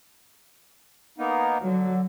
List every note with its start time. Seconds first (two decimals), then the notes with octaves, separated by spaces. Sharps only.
1.18 A#3 B3 D#4
1.63 D3 F#3